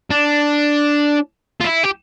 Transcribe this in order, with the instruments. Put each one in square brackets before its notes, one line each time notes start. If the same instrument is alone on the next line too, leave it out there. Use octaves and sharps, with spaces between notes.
[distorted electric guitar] D4
F4
E4
G4